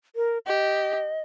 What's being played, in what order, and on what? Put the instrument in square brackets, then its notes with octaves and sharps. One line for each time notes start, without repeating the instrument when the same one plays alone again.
[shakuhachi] A#4
[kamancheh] G4 [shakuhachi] D#5